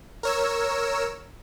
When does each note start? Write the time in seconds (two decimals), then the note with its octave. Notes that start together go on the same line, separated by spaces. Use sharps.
0.23 A#4 C#5 E6